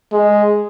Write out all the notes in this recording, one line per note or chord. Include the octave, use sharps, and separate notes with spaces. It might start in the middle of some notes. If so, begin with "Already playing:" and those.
G#3